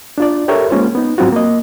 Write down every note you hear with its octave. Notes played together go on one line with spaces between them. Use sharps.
D4 F4 D5
G4 A4 A#4 C#5 E5
G#3 A#3 C#4 F4 C5
B3 D#4
G#2 F#3 C4 F4 F#4
A#3 D#5